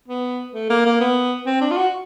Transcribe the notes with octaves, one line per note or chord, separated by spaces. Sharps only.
B3
A3
A#3
A#3
B3
C4
D4
F4
F#4